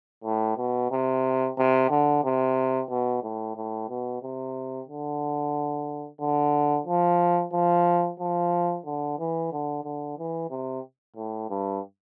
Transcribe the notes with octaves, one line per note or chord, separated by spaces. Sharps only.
A2
B2
C3
C3
D3
C3
B2
A2
A2
B2
C3
D3
D3
F3
F3
F3
D3
E3
D3
D3
E3
C3
A2
G2